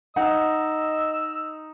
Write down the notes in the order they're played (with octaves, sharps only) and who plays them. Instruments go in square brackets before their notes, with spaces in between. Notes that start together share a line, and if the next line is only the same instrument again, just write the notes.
[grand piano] D#4 [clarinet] D#5 [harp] F#5 [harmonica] E6